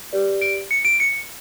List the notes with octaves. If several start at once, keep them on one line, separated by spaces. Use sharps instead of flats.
G4 B4 D5
D7
C#7
D7
C#7